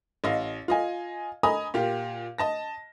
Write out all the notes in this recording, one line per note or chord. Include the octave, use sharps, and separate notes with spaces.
A1 D#5 F5
F4 D#5 G#5
D#5 G#5 A#5 B5 D#6
A#2 F4 G4
D#5 A5 A#6